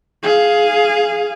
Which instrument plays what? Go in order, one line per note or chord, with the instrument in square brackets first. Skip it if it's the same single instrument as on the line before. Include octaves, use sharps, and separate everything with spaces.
[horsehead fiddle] G#4 F5